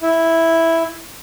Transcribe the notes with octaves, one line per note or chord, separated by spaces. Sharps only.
E4